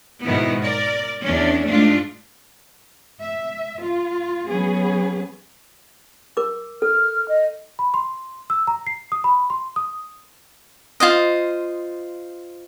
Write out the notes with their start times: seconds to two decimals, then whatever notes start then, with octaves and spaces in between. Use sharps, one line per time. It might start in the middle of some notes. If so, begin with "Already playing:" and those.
0.24 G#2 B2 D#3 B3 E4
0.62 A#4 D5
1.23 E2 C#4 D4
1.66 G#2 A3 D4 F4
3.22 E5
3.83 F4
4.48 F#3 B3 C#4 G#4 B4
6.37 A#4 D6
6.82 A4 F6
7.29 D#5
7.79 B5
7.94 C6
8.50 E6
8.67 A#5
8.87 C7
9.12 D#6
9.24 B5
9.50 C6
9.76 D#6
11.00 F4 C5 D#5